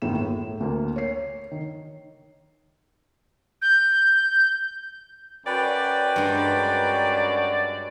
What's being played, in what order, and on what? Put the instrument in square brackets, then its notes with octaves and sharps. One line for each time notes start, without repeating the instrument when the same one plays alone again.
[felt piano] G1 D#2 A2 G#4 E7
A2
D2 A#3
C#5 C7
D#3
[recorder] G6
[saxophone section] F#2 F#4 D5 [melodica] B4 G5
[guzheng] G2 G#3